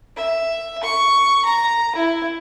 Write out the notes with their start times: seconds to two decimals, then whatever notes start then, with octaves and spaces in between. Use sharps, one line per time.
0.16 E5
0.83 C#6
1.45 A#5
1.95 E4